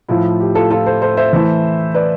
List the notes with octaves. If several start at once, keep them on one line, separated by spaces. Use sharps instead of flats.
A2 F3 A3 E4 F4
G4
F4 A4
F4 A4
A4 C5
A4 C5
C5 E5
E3 A3 E4
B4 D5